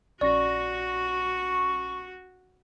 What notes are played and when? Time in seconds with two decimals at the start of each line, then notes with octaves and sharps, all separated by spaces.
0.21 A#1 C#4 F#4 D5 C#6 A#6